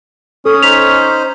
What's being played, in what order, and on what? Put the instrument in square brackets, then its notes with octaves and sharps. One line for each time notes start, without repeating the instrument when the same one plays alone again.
[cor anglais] C#4 [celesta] A4 [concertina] D#6
[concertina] D#4 C5 [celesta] B6 F7